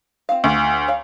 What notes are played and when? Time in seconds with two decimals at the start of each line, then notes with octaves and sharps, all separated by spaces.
0.29 C4 F4 F5
0.44 D2
0.88 C#5 F5 A#5